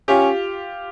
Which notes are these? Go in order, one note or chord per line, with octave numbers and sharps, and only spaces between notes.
C#4 F4 G4